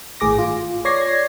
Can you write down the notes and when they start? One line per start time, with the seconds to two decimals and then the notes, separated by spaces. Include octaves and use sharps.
0.20 G#1 A2 G#4 D6 A#6
0.38 F4
0.85 C#5 D5 G#6 A#6 C7